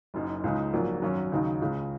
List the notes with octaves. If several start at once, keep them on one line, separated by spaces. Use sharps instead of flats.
F#1 F#2 F#3 D#4
C#2 C#3 G#3 D#4
A#1 G#2 F#3 A#3
G#1 F#2 F#3 C#4
D#2 C#3 F#3 D#4
C#2 C#3 G#3